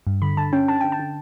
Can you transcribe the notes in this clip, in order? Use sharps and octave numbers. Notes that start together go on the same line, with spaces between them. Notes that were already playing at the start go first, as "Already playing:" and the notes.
G2
D3 B5
D3 A5
C#4 G5
D3 A5
D3 G5
A5
D3